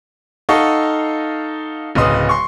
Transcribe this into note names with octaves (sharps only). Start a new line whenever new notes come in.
D#4 A4 D#5 F5 F#5 C#6
D1 C#3 B4 D#5 C6 D#6
C6 C#6